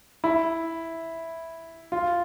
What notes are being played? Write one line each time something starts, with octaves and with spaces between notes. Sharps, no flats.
E4
F4